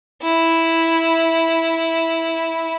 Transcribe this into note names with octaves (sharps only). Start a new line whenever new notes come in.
E4